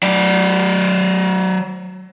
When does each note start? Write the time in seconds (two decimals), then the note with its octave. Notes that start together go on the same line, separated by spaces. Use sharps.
0.03 F#3 D5